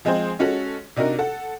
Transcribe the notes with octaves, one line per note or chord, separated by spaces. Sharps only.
F3 G#3 C4 G#4 C5
G#3 C#4 F#4 A4
C3 D4 D#4 F#4 A#4
A4 F#5